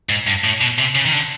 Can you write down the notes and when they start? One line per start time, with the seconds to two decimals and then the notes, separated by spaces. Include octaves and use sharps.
0.09 G#2
0.27 G2
0.44 A2
0.61 B2
0.78 C3
0.95 C#3
1.06 D#3
1.13 D3